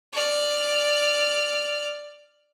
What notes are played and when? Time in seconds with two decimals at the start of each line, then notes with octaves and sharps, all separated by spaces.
0.13 D5 F6